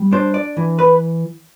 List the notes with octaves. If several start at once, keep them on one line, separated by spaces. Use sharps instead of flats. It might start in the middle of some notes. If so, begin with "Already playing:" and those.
Already playing: G3
D4 C5
D5
E3
B4